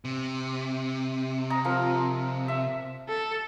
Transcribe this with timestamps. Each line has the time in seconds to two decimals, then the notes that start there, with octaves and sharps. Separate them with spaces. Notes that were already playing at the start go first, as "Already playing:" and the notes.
0.05 C3
1.50 D#5 A#5
1.65 F3 A#4
2.48 E5
3.09 A4